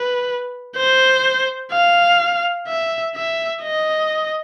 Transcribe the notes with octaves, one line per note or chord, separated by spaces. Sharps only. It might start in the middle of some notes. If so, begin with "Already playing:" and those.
Already playing: B4
C5
F5
E5
E5
D#5